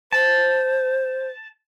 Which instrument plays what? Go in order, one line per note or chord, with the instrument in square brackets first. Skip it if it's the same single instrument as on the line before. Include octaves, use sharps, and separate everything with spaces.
[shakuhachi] C5 [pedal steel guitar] A5